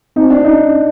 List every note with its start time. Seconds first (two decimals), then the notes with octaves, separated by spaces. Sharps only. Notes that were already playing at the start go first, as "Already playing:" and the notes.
0.16 C4 D#4
0.30 D4
0.44 C#4 D#4